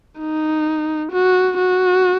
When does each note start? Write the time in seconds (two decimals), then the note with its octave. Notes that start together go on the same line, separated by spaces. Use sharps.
0.19 D#4
1.12 F#4
1.58 F#4